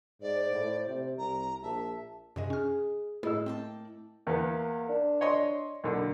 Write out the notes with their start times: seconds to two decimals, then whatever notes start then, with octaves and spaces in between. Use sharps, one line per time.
0.21 G#2 C5 D5
0.52 A2
0.88 C3
1.18 C2 A#5
1.62 A#1 E5 A5
2.36 F#2 C3 G#3 G#4 D#5
2.50 C#4 F6
3.23 A2 F3 E4 G#4 A4 D#5 E6
3.46 A#3 C4 G5 A5
4.27 E2 A#3 B3
4.89 D4
5.21 C#5 D#5 C6
5.84 B1 D3 A#3